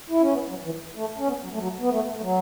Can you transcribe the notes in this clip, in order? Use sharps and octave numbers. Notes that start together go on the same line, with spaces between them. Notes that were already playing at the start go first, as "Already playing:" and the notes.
E4
C#4
B3
F#3
E3
A3
C#4
B3
F#3
A3
F#3
B3
A3
A3
F#3